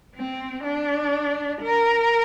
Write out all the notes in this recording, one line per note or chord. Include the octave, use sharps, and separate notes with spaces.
C4
D4
A#4